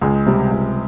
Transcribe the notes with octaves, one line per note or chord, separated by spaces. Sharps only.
C#2 G#3
C3 G3
C#2